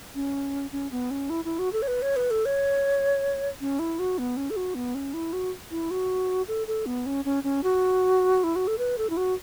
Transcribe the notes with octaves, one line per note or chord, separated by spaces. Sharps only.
C#4
C#4
B3
C#4
E4
E4
F#4
A4
C#5
B4
C#5
B4
A4
C#5
C#4
E4
F#4
B3
C#4
A4
F#4
B3
C#4
E4
F#4
E4
F#4
A4
A4
B3
C#4
C#4
C#4
F#4
E4
F#4
A4
B4
A4
E4
F#4